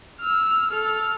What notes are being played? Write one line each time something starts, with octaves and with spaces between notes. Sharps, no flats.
E6 F6
A4 F6